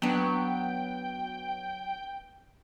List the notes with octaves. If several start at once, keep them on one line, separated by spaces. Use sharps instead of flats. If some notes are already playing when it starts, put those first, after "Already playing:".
F#3 B3 D4 G5